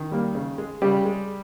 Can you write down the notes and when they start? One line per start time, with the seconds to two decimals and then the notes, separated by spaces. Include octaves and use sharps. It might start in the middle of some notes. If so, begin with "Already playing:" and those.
Already playing: D#3 D#4
0.11 G3 A#3
0.35 C#3
0.58 G#3
0.82 C#3 G3 G4
1.05 G#3